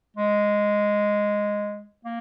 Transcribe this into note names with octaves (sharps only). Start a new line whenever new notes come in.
G#3
A#3